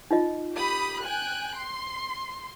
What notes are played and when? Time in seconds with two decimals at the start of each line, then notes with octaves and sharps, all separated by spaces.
0.11 D#4 F4 D#5
0.54 G4 B5 D#6
1.02 G5 G#5 F#6
1.55 C6